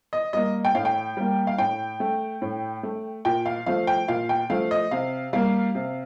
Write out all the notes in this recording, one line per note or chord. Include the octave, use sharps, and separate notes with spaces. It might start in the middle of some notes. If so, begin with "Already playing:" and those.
D#5
G3 A#3 D#5
G5
A2 F5
G5
G3 A#3
F5
A2 G5
A3
A2
A3
A#2 G5
F5
F3 A3 F5
G5
A#2 F5
G5
F3 A3 F5
D#5
C3 F5
G3 A#3 F5
C3